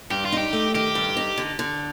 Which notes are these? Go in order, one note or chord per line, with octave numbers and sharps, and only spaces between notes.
G2 G4
F4
D#4
G4
A3
D#3 G4
G2
D#4
D3
D3